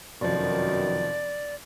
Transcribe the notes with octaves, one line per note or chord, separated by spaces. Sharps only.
F1 F#2 B2 D#3 F3 D5